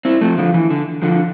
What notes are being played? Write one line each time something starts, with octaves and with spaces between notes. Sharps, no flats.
C4 E4
F3 A3
D3 F3
E3
D3
D3 F3